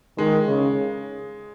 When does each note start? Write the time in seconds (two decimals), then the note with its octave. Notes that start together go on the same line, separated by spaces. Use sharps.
0.18 D#3 G#3
0.47 C#3